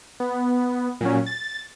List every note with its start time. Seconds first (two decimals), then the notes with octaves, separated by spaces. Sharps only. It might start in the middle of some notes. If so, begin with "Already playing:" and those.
0.20 B3
1.01 A#2 F#3 C#4
1.26 A6